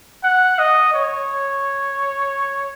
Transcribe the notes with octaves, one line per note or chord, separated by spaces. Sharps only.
F#5
D#5
C#5